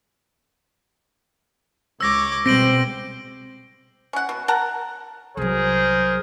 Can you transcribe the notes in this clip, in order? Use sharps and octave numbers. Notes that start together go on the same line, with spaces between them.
C#2 C#5 D6 E6 A#6
B2 G3 G#3 C4 C5 A#6 D7 F#7
C#4 F#5
B2
A#4 F#5 A5 A#5
C2 F#3 G#4 A#4 C5